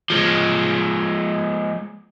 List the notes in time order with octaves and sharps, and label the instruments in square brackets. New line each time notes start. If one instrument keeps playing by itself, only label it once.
[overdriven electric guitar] F3 G#3